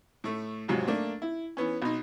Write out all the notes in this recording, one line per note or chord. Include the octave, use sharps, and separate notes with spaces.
A2 A3
F2 G#2 C3 F#3
A3 A#3 D4
E4
E3 B3 C#4
B1 D#4